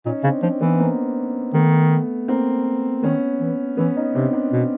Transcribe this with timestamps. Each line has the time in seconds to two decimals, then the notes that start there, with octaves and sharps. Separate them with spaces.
0.05 A#2 C#4 D#4
0.24 C#3 C4 D4
0.42 F3 C4 D4
0.61 E3 B3 C#4
0.79 A#3 C4
1.54 D#3 A3 B3
2.28 A#3 C4
3.03 D#3 B3 C#4
3.40 E3
3.77 E3 B3 C#4
3.96 C#4 D#4
4.15 C3 C4 D4
4.33 C4 D4
4.52 B2